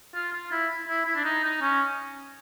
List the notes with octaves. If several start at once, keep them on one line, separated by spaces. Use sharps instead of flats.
F4
F4
E4
E4
E4
D4
D#4
D#4
C#4